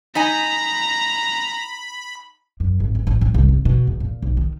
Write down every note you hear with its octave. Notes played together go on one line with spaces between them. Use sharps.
D#4 D#5 G#5 A#5 B5
F#2
G#1
E2
A1
A2
C2
C3
B2
E2
A#2
B1
D#3